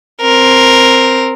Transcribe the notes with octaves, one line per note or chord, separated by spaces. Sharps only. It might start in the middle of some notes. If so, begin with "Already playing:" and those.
C4 A#4